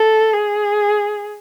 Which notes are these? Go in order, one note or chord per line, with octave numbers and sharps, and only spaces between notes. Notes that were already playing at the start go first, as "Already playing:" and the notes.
Already playing: A4
G#4